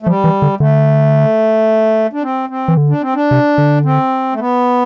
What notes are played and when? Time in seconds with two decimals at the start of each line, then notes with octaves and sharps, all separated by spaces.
0.02 A3
0.06 F3 G3
0.24 E3
0.42 D3
0.60 D3 A3
2.13 D4
2.23 C4
2.49 C4
2.68 E3
2.77 D3
2.89 D4
3.02 C4
3.15 D4
3.31 C3
3.58 D3
3.85 C4
4.33 A3
4.40 B3